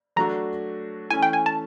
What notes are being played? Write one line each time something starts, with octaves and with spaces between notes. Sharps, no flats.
F#3 A3 D4 F#4 A#5
E3 A3 C#4 G#5
G5
G#5
A5